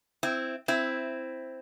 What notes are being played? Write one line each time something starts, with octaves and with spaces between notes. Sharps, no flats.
C4 E4
C4 E4